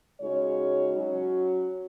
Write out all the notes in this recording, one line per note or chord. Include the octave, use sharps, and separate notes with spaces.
C#3 G#3 D#4 F#4 C#5
F#3 C#4 F#4